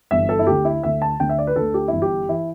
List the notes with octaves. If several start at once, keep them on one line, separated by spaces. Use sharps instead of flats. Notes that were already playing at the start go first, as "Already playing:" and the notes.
G1 G2 E3 E5
A4
E4
D2 D3 G4
E4
D2 D3 E5
A5
D2 D3 G5
E5
D5
B4
D2 D3 A4
G4
G1 G2 E3 E4
G4
E3 E4